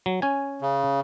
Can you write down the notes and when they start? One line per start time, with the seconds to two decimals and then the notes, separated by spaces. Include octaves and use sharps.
0.06 F#3
0.22 C#4 G#5
0.62 C#3